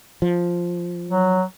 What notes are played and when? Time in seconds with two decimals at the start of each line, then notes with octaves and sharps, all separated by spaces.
0.22 F3
1.11 F#3